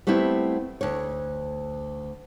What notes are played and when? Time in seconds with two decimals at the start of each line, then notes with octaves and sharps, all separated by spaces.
0.07 G3 A3 B3 C4 E4
0.81 D2 C#5